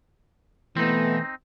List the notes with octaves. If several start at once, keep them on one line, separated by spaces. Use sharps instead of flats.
B2 E3 A3 B3 C4 D#4